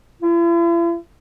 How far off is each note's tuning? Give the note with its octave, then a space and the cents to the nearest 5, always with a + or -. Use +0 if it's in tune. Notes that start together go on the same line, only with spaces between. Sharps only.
E4 +45